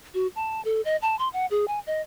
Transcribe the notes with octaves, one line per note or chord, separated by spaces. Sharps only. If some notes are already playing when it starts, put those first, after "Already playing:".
F#4
A5
A4
D#5
A5
C6
F#5
G#4
G#5
D#5